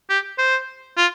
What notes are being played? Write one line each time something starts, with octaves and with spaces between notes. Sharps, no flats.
G4
C5
F4